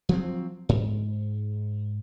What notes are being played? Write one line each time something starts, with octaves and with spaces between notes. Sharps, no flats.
F3 F#3 C4
G#2